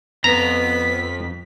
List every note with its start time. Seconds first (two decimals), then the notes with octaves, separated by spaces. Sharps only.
0.24 F2 B3 A#5 B6